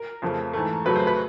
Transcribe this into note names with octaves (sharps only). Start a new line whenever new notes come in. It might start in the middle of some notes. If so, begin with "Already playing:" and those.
Already playing: A#4
F2 C#3 F3 A3
G#2 E3 A3
F2 C#3 F#3 A3 B4
C5
B4